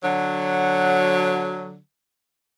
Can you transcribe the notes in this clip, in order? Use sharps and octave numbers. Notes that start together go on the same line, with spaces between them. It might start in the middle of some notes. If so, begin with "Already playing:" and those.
D3 F#3